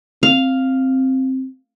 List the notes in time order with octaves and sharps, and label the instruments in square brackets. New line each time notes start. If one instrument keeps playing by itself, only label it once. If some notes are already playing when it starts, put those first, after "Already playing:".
[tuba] C4 [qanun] F5